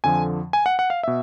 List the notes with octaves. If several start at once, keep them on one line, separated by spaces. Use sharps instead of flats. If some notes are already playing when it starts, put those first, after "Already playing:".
F2 D3 F3 G#5
G#5
F#5
F#5
F5
B2 E5